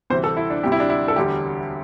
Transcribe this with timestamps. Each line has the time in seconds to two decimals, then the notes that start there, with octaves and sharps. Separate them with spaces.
0.10 D2 C3 E3 G3 C5
0.24 A4
0.37 E4
0.50 D4
0.63 D2 C3 G3 G4
0.72 E4
0.80 D4
0.90 E4
1.08 A4
1.16 E1 D2 D3 G3 G4